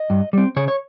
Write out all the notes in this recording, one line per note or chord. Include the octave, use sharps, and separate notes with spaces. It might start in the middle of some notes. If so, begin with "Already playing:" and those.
Already playing: D#5
G2
G3 C4
C#3 C#5
C#5